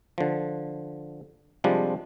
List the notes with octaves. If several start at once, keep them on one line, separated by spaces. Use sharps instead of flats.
D3 F3
C3 F3 G3 G#3 D4